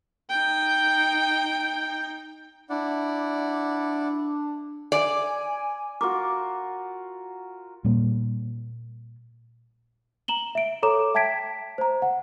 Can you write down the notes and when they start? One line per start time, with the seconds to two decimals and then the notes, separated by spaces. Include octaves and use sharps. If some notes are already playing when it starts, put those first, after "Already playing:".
0.30 D#4 G5
2.70 D4 E4 D5 F#5
4.92 D5 G#5
6.01 F4 F#4 A#4 D6
7.84 A#2 G3 A#3
10.28 A#5 E7 F#7 G7
10.55 E5 D7
10.83 A4 C#5 A#5 D6 E7
11.14 E5 G5 A5 G#6 B6 D7
11.78 C5 A#5
12.02 F#5